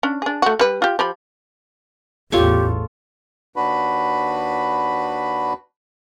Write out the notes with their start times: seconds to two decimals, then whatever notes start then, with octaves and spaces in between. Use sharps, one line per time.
0.03 C#4 D4
0.22 D4 G#4
0.42 A3 F#4
0.59 G3 B4
0.82 F4 G4
0.99 F3 G4 B5
2.32 A1 E2 F4 G4 A4 C#5
3.56 D#2 D4 F#4 B4 B5